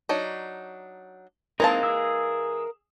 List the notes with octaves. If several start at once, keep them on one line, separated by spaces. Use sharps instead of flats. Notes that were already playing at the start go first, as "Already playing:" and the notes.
F#3 D4 D#4
E3 G#3 C4 D#4 A#4 F5 A5
G#4 E6